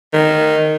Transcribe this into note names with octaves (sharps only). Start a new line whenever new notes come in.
D#3